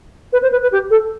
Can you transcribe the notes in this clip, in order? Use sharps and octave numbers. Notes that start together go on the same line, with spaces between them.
B4
C5
B4
B4
G4
A4